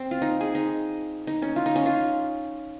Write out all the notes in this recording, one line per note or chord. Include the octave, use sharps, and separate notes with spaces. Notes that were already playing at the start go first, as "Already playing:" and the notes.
Already playing: C4
F4
D#4
G#4
D#4
D#4
C#4
F4
D#4
C#4
F4